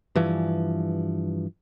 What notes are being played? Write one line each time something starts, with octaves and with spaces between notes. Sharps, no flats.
G2 E3 F3